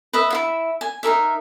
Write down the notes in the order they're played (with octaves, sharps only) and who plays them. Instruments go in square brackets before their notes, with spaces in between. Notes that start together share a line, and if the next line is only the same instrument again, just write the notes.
[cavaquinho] B4 D#5 E5
E4 F4 E5
G#5
D#4 A4 A#4 E5